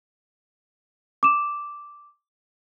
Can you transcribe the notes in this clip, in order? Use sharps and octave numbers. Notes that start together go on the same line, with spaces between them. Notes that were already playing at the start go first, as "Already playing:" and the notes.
D6 E7